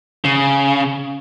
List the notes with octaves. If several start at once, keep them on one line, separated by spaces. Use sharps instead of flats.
C#3